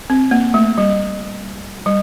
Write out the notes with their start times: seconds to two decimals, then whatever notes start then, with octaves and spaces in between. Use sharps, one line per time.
0.10 C4
0.31 A#3
0.54 A3
0.78 G3
1.86 G3